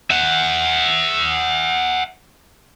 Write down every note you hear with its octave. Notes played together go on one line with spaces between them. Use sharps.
E5 F#5